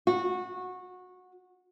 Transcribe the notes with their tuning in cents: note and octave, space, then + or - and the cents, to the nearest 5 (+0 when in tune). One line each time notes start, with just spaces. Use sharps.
F#4 -20